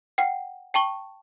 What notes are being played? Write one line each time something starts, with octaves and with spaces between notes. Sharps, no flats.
F#5 G5
G5 A5 C#6 G7